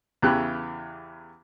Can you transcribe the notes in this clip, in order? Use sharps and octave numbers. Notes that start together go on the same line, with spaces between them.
E2 C#3 E3 G4 F#6